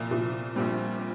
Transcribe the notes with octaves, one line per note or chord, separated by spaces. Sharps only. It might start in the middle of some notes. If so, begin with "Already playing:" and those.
Already playing: C2 A#2 F3
C2 A#2 F3
A#1 A#2 G3 C4
C4